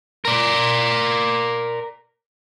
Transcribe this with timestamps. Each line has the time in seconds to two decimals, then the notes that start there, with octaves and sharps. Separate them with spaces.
0.25 A#4 D5